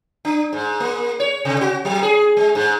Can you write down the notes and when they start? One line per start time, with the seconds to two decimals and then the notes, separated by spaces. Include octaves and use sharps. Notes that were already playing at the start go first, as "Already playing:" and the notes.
0.25 D4
0.53 G#2
0.80 A#3
1.20 C#5
1.45 C3
1.61 F#4
1.85 F#3
2.03 G#4
2.37 G#3
2.55 G#2